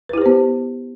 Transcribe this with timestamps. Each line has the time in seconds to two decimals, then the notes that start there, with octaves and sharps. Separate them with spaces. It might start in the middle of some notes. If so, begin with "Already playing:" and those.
0.09 B4
0.13 E4
0.18 G4
0.22 C5
0.26 B3